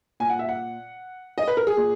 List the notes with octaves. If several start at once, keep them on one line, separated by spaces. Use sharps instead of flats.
A#2 G#5
F#5
E5
F#5
D#5
B4
A#4
G#4
A#2